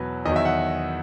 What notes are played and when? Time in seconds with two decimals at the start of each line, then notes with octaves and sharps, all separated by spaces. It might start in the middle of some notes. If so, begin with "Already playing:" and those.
Already playing: E2 B2 F#3 B4
0.26 E2 D#3 F#3 D#5
0.36 E5
0.45 F#5